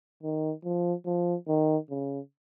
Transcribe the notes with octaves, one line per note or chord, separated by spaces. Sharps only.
D#3
F3
F3
D#3
C#3